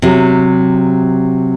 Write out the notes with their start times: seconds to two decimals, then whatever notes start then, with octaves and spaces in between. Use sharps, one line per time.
0.02 C3 F#3